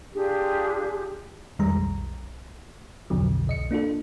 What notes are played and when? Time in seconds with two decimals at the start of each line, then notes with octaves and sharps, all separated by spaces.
0.13 D4 F4 G4 G#4
1.59 F2 D#3 G3 G#3 A#5
1.77 B1
3.10 B1 F2 B2 D3 F3 F#3
3.47 C2 D#5 C#7
3.71 A#3 D4 F4 A4